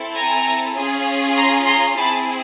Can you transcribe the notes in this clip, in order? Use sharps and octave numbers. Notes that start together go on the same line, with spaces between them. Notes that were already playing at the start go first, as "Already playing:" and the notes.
Already playing: C4 E4 A4
G#5 A#5
C#4 F4 G#4
A#5 C6
A#5 C6
C4 E4 G#4 A5 B5